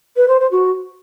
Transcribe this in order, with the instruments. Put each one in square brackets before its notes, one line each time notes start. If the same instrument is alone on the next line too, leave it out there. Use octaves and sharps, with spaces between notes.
[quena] B4
C5
C5
F#4